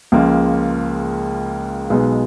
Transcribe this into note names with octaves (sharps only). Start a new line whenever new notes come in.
C#2 C#3 F3 A#3
B1 B2 G#3 B3